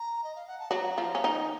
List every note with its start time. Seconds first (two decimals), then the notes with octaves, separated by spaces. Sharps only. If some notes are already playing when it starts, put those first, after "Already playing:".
Already playing: A#5
0.24 D#5
0.35 F5
0.47 F#5
0.59 A5
0.71 F#3 F#4 A#5
0.98 F3 F4
1.15 C#4
1.24 D#3 D#4